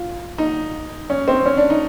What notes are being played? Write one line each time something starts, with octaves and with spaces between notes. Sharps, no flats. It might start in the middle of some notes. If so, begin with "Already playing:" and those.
Already playing: F4
D#4
C#4
C4
C#4
D4
D#4